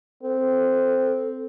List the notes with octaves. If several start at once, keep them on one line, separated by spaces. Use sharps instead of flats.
C4 A4